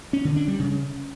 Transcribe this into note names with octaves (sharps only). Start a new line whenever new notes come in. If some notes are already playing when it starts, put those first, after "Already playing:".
C#4
D3
D4
G3
C#3